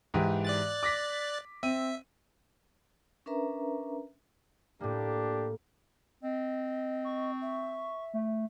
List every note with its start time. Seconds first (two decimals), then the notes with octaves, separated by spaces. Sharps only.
0.14 G#2 E3 G4
0.45 D5 F#6 A6
0.83 D6 A#6 B6
1.63 C4 E5 D#7
3.26 C#4 D4 A#4 B4 E5 A#5
4.80 A2 A#3 D4 G4
6.23 C4 D#5
7.05 C#6
7.41 E5
8.14 A3